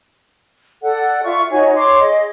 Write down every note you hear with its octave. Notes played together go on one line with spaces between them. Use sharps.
A4 D5 F#5
F4 E5 C#6
D#4 F#4 C#5 G#5
C#5 C6 D6
G#4 D#5